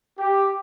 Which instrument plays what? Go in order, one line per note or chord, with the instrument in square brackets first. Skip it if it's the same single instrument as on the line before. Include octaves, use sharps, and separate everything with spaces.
[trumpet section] G4